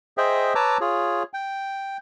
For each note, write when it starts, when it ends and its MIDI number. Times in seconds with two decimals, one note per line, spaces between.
0.18 0.54 68
0.18 0.54 72
0.18 0.54 75
0.18 0.54 76
0.18 0.54 79
0.55 0.78 71
0.55 0.78 73
0.55 0.78 81
0.55 0.78 82
0.55 0.78 86
0.55 0.78 88
0.80 1.23 65
0.80 1.23 68
0.80 1.23 73
1.34 1.97 79